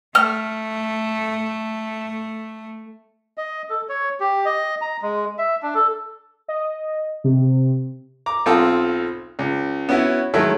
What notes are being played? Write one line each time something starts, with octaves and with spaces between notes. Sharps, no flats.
A3 F6
D#5
A4
C#5
G4
D#5
A#5
G#3
E5
D4
A4
D#5
C3
A#5 D6
B1 C4 F4 A4 D#6
C#2
B3 C#4 E4 F#4
D#3 F#3 G#3 A3 E4